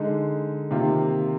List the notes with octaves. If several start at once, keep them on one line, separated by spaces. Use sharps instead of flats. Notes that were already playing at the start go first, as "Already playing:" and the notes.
Already playing: D3 G#3 D#4
C3 D#3 A#3 F4